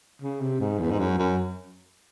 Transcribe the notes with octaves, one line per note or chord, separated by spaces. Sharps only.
C#3
C3
G#2
E2
G#2
F#2
F#2